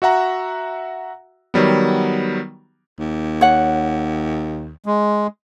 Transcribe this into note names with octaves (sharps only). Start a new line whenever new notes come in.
F#4 E5 F#5 A#5
D#3 F#3 G3 B3
D#2
C#5 F#5
G#3